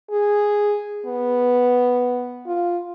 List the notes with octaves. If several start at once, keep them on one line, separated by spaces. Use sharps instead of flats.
G#4
B3
F4